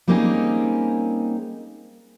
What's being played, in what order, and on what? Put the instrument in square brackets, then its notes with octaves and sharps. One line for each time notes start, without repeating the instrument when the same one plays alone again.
[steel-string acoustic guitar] G3 A#3 C4 C#4 D#4 G#4